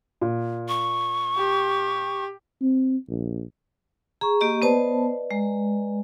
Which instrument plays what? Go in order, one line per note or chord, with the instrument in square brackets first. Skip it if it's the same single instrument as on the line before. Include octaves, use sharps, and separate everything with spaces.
[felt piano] A#2
[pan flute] C#6
[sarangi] G4
[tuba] C4
A#1
[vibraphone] G#4 [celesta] A#5 C#6
[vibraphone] A#3 G4 D#5
[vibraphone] B3 C5 A5 [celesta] B4 D5 D#5
[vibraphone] G#3